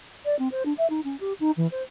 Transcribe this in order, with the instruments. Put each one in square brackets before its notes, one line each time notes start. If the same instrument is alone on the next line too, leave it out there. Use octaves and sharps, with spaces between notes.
[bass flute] D5
C4
C5
D4
E5
D#4
C#4
G4
D#4
E3
C5